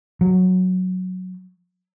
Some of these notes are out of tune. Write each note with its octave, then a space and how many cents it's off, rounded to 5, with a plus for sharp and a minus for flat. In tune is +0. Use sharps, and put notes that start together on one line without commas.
F#3 -5